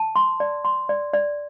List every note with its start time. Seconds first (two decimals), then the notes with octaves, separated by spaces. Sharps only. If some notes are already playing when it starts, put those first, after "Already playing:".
Already playing: A5
0.16 C6
0.40 D5
0.65 C6
0.89 D5
1.13 D5